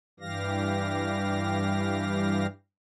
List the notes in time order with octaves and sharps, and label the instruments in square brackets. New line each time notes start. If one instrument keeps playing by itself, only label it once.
[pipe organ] G2 E3 G3 G4 F5 A#6